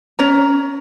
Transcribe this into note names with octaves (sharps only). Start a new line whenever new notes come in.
C#4 C#5 A#5